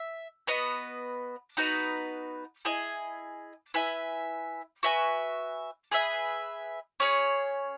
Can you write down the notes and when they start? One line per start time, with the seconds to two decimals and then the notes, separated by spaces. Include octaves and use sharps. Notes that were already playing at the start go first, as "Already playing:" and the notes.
Already playing: E5
0.47 B3 F#4 B4 D#5
1.57 B3 D#4 F#4 B4
2.65 E4 G#4 D#5 G#5
3.74 E4 B4 E5 G#5
4.83 F#4 B4 E5 G#5
5.91 G#4 B4 E5
7.00 C#4 G#4 C#5